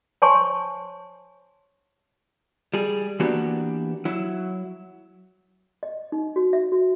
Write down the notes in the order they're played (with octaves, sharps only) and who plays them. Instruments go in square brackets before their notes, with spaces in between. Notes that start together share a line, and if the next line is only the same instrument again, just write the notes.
[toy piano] C5 C#5 G#5 A5 C6 C#6
[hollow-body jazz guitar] G3 G#4
E3 A#3 B3 D4 F#4 G4
F#3 E4
[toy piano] D#5
D#4
F#4
E5
F#4